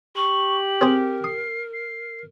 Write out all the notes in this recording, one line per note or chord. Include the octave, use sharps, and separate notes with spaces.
G4 C#6 F#7
C4 G#4 A#4 C5
D#6 C7
C7